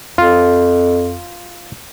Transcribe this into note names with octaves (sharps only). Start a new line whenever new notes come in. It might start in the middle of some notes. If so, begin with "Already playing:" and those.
F2 F4